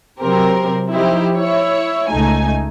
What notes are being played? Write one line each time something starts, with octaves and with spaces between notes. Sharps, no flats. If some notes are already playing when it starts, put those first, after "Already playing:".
C3 F#3 C4 G4 A#4
F3 D#4 E4 G4 C5
E4 C#5
C#2 A3 D#4 G#5